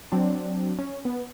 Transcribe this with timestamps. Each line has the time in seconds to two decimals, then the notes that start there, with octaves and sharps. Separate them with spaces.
0.12 F#3 C4 D4
0.79 C#4
1.05 B3